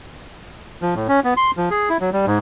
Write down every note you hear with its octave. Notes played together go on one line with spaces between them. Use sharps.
F3
A2
C#4
B3
C6
F3
G#4
E4
F#3
G3
G#2